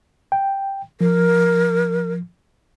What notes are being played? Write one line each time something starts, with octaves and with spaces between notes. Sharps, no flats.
G5
F3 A#4